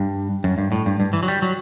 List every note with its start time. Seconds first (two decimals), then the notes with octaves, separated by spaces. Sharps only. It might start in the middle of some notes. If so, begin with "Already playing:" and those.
Already playing: G2
0.44 F#2
0.58 G2
0.72 A2
0.86 G2
1.00 G2
1.13 E3
1.23 F#3
1.28 G3
1.42 F#3